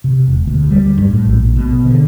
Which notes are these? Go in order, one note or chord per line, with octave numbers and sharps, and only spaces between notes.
C3
E1
D2
G3
G2
A2
A#1
B2
D3